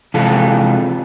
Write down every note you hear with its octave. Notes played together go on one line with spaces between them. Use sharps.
C3 E3 G#3 F4 A4